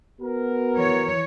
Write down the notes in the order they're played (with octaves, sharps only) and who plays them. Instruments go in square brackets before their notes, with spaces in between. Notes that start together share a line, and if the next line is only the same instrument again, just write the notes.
[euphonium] B3 [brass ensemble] F#4 A#4
[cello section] E3 C#5